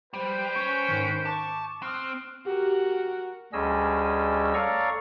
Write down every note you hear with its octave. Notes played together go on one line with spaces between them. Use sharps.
G3 B4 C5 G5
C#4 C#6
G#2 D#3
A5 C#6 D6
C4 D#6 F6 F#6
F#4 G4 A#4
D2 G3 C#4 G#4 D#5 E6
A4 C#5 D5 F5 A#5 C#6